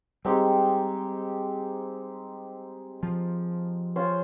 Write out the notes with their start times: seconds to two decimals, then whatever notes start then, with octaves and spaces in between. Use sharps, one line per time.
0.25 G3 G#3 C4 D#4 G4
3.03 F3
3.96 C#4 F4 C5